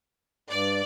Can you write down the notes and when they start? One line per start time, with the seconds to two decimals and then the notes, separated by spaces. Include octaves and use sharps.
0.50 G2 D5